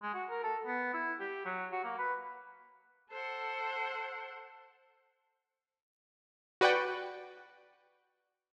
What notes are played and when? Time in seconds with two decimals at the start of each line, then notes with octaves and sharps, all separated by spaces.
0.02 G#3
0.14 F#4
0.30 A#4
0.43 A4
0.66 B3
0.94 E4
1.20 G4
1.45 F#3
1.72 F#4
1.84 A#3
1.98 B4
3.10 A4 C5 F#5
6.61 F#4 B4 D5 F#5 G5